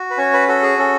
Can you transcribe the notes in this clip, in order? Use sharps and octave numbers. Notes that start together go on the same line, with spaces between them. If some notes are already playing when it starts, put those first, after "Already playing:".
Already playing: F#4
B4
C#4 C#5
B4
F#4 A4
G#4
C#4 A4